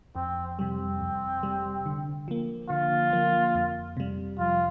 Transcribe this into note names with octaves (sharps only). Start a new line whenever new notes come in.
F2 C4
C3 G3 C4
F2
C3 G3
D3
F3 A#3
D3 F4
F3 A#3
F2
C3 G3
F2 F4